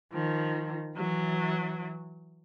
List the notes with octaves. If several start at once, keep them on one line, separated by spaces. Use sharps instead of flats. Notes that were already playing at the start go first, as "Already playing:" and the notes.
D#3 F3
E3 F#3